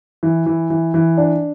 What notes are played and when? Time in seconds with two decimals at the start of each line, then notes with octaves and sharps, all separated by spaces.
0.23 E3
0.46 E3
0.70 E3
0.94 E3
1.18 D4